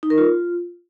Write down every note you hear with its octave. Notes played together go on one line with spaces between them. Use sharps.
D#4
A#4
F4